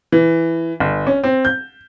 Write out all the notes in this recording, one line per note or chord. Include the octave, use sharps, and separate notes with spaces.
E3
G1
C#4
C4
G6